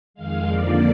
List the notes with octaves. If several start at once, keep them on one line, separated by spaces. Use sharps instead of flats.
F2 D#3 G#3 F5
F2 D3 F3 A#3 D5